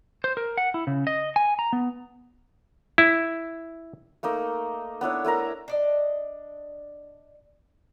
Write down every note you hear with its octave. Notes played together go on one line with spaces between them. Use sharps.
C5
A#4
F#5
E4
C#3
D#5
G#5
A#5
B3
E4
A3 A#3 D#4
B3 D4 E4 C#5
A3 E4 A#4 A#5
D4 D5 D#5